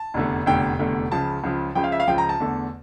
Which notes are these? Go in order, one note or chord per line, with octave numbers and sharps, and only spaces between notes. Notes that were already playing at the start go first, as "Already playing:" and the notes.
Already playing: A5
F1 E2 D3 A3
F1 E2 D3 A3 G5
F1 E2 D3 A3
C#2 C#3 F3 A5
C#2 C#3 F3
C#2 C#3 F3 G5
F5
E5
F5
C#2 C#3 F3 G5
A#5
A5
E2 D3 A3